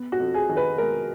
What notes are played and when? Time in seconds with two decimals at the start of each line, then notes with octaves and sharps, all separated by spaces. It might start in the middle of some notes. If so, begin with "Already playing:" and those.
Already playing: B3
0.12 F#4
0.20 F2
0.34 G#4
0.49 D#3
0.57 B4
0.78 G#3 A#4